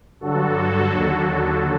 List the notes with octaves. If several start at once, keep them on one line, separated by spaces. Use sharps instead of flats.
G2 D3 F#3 F#4 A4
D#2 D3 F#3